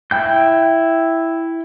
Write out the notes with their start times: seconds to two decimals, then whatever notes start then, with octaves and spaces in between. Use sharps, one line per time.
0.11 E4 G5 G6